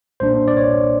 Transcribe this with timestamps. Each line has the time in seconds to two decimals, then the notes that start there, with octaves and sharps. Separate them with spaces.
0.20 B1 A#2 G3 A#3 D4 C5
0.48 D5
0.57 C#5